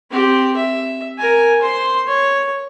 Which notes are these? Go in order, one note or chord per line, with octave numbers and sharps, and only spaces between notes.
C4 G4
E5
A#4 G#5
C5 C6
C#5